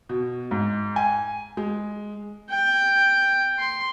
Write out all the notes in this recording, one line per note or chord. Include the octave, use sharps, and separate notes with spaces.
B2
G#2
G#5
G#3
G5
C6